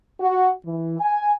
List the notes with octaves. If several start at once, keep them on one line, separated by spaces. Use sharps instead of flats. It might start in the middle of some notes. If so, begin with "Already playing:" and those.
F#4
E3
G#5